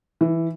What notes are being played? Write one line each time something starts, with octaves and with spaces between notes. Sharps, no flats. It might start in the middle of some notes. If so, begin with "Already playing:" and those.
E3